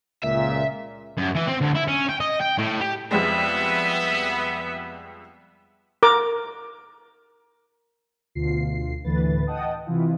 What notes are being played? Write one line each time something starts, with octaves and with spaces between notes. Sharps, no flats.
C#2 A#2 E5
F#2
E3
C4
D2
E4
C#4
G5
D#5
G5
A2
G4
F2 G3 G#3 B3 E5
A#4 D6
D2 B2 F4 C7
D2 A2 D3 E3 B4 A6
D#5 F#5 G5 A5 D#6
C3 E3 E4 F4